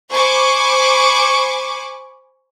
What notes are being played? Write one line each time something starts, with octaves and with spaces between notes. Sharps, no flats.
C5 G#5 B5 C#6 D6